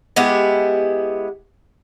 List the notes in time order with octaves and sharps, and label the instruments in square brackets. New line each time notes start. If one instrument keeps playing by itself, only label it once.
[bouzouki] G#3 B3 E4 G4